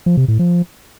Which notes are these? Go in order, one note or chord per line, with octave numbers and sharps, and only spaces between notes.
F3
C3
A2
F3